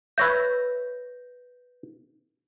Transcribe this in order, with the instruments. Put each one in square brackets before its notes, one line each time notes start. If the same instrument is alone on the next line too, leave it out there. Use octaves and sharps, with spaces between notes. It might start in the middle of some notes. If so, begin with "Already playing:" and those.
[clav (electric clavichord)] B4 C#5 E5 [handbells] G6 A#6